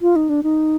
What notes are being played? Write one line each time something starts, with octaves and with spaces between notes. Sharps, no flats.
F4
D#4
D4
D#4